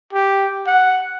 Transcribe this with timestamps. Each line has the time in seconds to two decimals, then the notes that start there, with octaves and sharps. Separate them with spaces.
0.13 G4
0.67 F#5